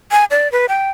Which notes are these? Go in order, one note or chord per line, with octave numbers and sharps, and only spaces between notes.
G#5
D5
B4
G5